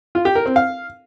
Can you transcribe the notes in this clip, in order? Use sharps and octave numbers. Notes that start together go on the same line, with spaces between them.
F4
G4
A#4
C4
F5